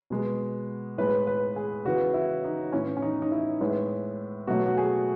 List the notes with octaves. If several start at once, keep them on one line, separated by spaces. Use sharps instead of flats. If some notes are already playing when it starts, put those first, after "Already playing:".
B2 G#3 B3
A2 G#3 B3 B4
B4
G#4
C#3 E3 B3 F#4
E4
D#4
A2 E3 B3 C#4
C#4
D#4
D#4
E4
A2 G#3 B3
B2 F#3 A3 F#4
F#4
G#4